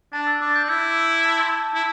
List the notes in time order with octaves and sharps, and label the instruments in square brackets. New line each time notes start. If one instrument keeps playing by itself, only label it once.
[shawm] D4 [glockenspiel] A5 A6
[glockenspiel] E6
[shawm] D4 [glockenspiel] D6
[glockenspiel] G6
[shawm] D4
[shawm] E4 [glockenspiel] E6
[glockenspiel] D6
E6
A5 A6
C6
A5
A5
[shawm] E4